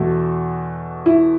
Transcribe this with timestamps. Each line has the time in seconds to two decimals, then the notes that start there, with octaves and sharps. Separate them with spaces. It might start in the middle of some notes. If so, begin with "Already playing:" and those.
Already playing: E2 B2 A3 F#4
1.06 E4